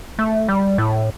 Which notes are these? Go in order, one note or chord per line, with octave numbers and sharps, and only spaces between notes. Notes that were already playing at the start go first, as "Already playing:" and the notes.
A3
G3
A2